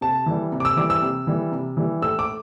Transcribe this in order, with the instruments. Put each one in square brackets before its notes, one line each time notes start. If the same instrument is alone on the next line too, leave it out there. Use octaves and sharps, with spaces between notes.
[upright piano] C3 A5
E3 G3
C3
D6
E6
E3 G3 D6
E6
C3
E3 G3
C3
E3 G3
A2 E6
D6